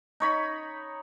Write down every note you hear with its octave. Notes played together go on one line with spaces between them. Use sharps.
D#4 C#5 B5